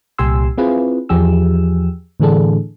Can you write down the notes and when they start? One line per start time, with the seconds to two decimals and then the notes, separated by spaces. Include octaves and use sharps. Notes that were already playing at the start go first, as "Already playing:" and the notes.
0.18 C2 A#2 G4 G#5 C6 E6
0.58 C4 E4 F4 G#4 B4
1.09 E2 F3 G4 G#4 E6
2.20 A2 D3 E3 D4 G#4 A4